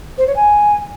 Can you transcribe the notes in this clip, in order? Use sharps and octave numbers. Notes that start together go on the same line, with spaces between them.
C5
C#5
G#5